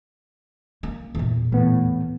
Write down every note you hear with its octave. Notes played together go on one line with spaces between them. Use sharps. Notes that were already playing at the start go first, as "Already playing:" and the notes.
A#3
E2 A#2
A2 E3 B3